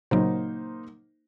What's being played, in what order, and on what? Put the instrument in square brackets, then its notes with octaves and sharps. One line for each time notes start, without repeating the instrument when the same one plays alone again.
[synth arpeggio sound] A#2 C#3 F#3 [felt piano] A#3 D#4 C5